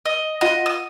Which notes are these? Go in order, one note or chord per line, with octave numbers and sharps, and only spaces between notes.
D#5
F4 D#5 F#5
D#6